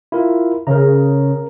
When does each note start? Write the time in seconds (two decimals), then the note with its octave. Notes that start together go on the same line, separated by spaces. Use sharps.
0.12 E4 F4 A#4
0.67 C#3 A#4 A#5